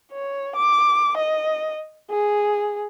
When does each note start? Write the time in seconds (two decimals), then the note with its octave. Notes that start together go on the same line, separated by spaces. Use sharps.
0.12 C#5
0.56 D6
1.17 D#5
2.11 G#4